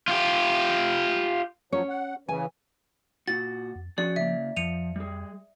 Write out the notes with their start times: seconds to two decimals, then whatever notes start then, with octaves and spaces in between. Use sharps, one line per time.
0.08 F4 G4
1.72 F3 F#3 C#4 C#5
1.89 F#5
2.29 C#3 E3 G#5
3.28 A#2 F#4 A6
3.75 F2
3.98 F3 C#4 F#4 G#4 D5
4.16 C#3 A#3 E5
4.56 F2 F3 C#7 D#7 F7
4.96 G3 G#4